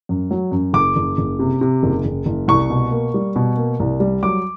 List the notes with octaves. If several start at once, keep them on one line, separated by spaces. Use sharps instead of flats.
F#2
F#3
F#2
F#1 D6
F#1
F#1
C3
C3
F#1
F#1
F#1
C2 C#6
B2
A#3
G3
B2
A#3
C2
G3
F#3 D6